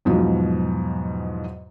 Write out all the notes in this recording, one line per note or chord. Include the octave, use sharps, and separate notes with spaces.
E2 G#2 B2 F3 F#3